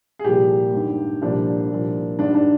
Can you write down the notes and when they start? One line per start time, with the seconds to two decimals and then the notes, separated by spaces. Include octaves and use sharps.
0.19 G#4
0.24 C2 A#2 F3 G4
0.74 G#1 G2 D#3
1.22 C2 A#2 F3 D4
1.71 C2 A#2 F3
2.18 G#1 G2 D#3 D4
2.35 D4